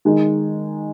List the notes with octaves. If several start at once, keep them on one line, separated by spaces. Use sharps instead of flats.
D#3 G#3 D#4